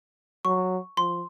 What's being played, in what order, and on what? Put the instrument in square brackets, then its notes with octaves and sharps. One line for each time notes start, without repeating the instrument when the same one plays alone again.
[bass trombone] F#3 [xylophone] C#6
[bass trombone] F3 [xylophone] C6